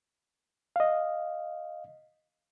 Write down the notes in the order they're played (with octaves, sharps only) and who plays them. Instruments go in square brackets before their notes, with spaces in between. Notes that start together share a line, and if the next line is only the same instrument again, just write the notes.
[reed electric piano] D#5 F5